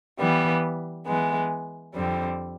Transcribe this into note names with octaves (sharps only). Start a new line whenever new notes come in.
E3 G3 B3
E3 G#3 B3
F2 D3 G3 C4